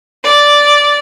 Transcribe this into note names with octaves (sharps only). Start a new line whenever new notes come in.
D5